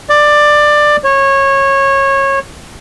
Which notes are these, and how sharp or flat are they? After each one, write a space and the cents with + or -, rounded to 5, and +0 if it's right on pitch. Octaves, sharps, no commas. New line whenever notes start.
D5 +15
C#5 -20